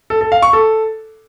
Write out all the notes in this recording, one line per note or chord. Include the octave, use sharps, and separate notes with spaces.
A4
A4
F5
C#6
A4